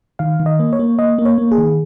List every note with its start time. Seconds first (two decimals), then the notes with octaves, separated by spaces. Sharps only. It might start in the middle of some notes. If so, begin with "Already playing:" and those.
0.19 D#3 F5
0.40 D#3
0.46 D#5
0.59 A#3
0.73 C#5
0.79 A#3
0.99 A#3 D#5
1.18 A#3
1.25 C#5
1.38 A#3
1.52 G#4
1.58 D#3